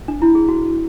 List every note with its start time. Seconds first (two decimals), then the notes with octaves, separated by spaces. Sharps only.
0.08 D4
0.22 E4
0.35 G#4
0.49 F#4